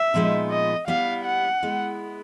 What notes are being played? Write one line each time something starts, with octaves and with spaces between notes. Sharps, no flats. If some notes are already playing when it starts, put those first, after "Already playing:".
Already playing: E5
A#2 F3 G#3 B3 D#4
D#5
G3 B3 E4 F5
F#5
G#3 B3 E4